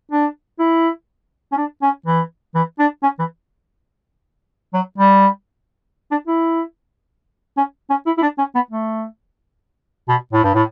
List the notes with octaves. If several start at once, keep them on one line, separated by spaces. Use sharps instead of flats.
D4
E4
C#4
D4
C#4
E3
E3
D4
C#4
E3
F#3
G3
D4
E4
C#4
C#4
E4
E4
D4
C#4
B3
A3
B2
A2
G2
A2